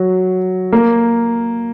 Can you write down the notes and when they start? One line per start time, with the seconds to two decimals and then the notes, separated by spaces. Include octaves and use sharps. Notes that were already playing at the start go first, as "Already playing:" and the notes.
Already playing: F#3
0.72 A#3